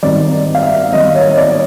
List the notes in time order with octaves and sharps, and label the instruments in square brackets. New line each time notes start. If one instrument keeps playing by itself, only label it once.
[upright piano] G#1 G2 D#3 D5
F5
E5
G#1 G2 D#3 D#5
C#5
C#5
D5